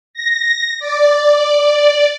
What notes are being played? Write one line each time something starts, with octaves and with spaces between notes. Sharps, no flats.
A#6
D5